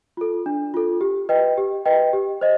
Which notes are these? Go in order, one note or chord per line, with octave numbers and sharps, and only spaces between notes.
F4 A4
D4
F4 A4
G4
B4 D#5 G5
G4
B4 D#5 G5
G4
C5 D#5